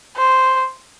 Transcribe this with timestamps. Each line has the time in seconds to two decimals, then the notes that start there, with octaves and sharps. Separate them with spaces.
0.16 C5